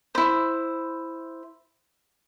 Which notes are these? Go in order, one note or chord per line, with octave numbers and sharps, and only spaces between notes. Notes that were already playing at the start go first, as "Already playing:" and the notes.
E4 C5